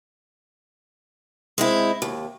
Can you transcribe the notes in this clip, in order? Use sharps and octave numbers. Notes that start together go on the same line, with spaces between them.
G#3 C4 E4
D#2